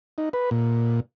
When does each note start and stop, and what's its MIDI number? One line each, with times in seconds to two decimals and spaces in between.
0.18 0.29 63
0.33 0.50 71
0.51 1.00 46